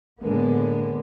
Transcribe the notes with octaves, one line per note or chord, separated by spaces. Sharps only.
A2 D3 G#3 A#3 B3